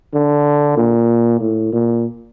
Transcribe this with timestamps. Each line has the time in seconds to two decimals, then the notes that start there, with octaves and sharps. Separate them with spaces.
0.14 D3
0.77 A#2
1.40 A2
1.73 A#2